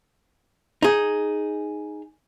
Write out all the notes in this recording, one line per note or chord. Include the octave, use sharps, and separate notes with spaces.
D#4 G#4